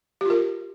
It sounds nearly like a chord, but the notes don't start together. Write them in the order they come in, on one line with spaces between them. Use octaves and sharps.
G4 F4 A#4